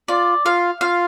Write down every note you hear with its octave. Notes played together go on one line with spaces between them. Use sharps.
F4 D5
F4 F5
F4 F5